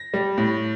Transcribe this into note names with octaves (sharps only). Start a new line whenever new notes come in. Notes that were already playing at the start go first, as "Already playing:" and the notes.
Already playing: A#6
G3
A2